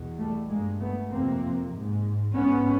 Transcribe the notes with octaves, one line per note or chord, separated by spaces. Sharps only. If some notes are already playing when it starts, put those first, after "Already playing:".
Already playing: E2 B2
G3 A3
G2 G#3 A#3
A3 B3
F2 C3 A#3 C4
G#2
G#2 B3 C#4